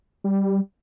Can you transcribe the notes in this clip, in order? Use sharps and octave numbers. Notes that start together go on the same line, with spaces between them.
G3